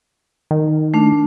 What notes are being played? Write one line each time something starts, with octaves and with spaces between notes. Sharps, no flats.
D#3
A3 D4